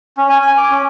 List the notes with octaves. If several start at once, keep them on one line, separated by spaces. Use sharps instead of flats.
C#4
G#5
G#5
D6
C#4